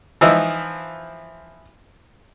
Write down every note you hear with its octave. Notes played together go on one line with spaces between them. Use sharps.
E3 F3 D#4 E4